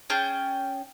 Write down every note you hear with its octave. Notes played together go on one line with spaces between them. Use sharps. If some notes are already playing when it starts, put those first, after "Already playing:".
C#4 G#4 G5 A5